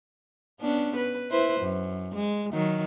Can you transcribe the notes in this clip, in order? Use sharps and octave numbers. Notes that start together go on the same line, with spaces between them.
B3 C#4 D4
B4
E4 B4 C5
F#2
G#3
D#3 F#3